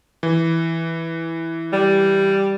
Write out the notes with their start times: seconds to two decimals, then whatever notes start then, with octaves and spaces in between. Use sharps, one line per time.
0.23 E3
1.73 G3